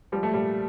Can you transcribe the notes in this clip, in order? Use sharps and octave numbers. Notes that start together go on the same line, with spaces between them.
F3 G3
A3
A#2 G3